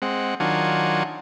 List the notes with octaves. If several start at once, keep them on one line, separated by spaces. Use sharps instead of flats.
G#3 C4 F#5
D#3 F#3 D4 F4 F#5 G#5